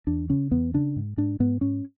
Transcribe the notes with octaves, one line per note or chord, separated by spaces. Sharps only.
E2 D4
C#3 C#4
E2 B3
C#3 D4
G#2
G#2 D4
G#2 B3
G#2 C#4